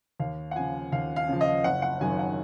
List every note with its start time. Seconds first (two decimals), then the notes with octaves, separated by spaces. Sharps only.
0.20 D#2 F5
0.51 F#5
0.55 C#3 F3 G#5
0.92 D#2 F5
1.16 F5
1.28 C#3 F3
1.41 D#5
1.64 F#1 F#5
1.82 F#5
2.01 F#2 D#3 F#3 G#5
2.19 F#5